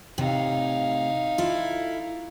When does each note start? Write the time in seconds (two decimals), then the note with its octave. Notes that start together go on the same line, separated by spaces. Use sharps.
0.18 A2 C3 D#4 F5
1.38 E4 F4 A4